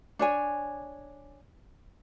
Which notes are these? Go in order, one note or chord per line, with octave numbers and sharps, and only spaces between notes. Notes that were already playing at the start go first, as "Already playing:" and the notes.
D4 C#5 G#5